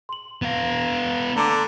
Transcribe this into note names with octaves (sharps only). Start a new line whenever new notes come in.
C6 F#7
B3 F5
D3 A#5 D6